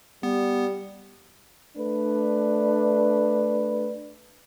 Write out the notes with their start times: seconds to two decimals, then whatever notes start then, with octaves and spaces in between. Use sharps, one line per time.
0.23 G3 B3
1.76 A3 D4 B4